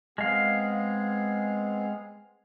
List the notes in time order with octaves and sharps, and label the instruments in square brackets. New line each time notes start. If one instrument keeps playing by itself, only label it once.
[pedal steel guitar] G#3 F5 [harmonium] B3 C4 G#4